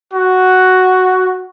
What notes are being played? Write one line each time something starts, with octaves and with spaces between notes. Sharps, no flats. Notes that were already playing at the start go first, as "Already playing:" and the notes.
F#4